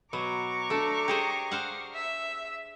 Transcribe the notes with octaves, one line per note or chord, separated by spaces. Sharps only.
B2 F#3 A#5 C#6 D6
A3 D4
G4 G#4 C5
C5 F5 F#5
E5